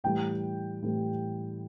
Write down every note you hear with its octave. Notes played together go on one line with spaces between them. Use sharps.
A2 E3 G3 G5
A2 E3 G3